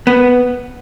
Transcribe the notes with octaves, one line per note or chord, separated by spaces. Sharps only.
B3